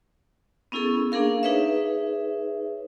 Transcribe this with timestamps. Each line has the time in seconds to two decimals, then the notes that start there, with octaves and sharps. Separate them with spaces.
0.72 B3 C#4 E4 G#4 A4
1.12 A#3 D4 G#4 A#4 F5
1.43 D#4 G#4 B4 C#5 E5